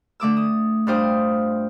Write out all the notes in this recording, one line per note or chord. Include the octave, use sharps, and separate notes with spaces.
D3 A3 D6 E6
D#6
G2 D4 F4 C5 G5 D#6